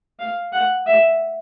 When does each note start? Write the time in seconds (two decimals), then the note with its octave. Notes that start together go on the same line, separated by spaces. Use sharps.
0.20 F5
0.53 F#5
0.86 E5